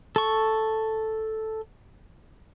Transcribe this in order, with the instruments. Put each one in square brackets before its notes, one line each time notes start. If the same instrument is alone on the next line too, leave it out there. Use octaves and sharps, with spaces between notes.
[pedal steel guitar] A4 C#6